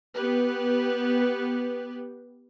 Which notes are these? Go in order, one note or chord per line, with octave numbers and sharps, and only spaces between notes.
B3 G4 B4